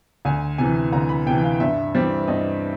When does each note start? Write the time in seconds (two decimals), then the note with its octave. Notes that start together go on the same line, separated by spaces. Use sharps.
0.25 D2 G#5
0.58 C3 E3 G#5
0.92 D2 A#5
1.09 B5
1.26 C3 E3 G5
1.43 F5
1.60 G2 E5
1.95 E3 G3 C4
2.28 G2 D#5